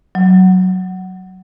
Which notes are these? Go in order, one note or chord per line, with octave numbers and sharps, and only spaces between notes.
F#3